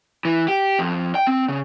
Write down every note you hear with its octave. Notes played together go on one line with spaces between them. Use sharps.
E3
G4
F2
G5
C4
C#3